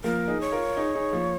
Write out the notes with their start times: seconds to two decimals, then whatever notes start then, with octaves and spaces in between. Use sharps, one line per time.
0.03 F3 A#3 A#4
0.28 D#4 G#4
0.41 C#5
0.52 F4 A#4
0.76 D#4 G#4
0.95 D#4 G#4
1.12 F3 A#3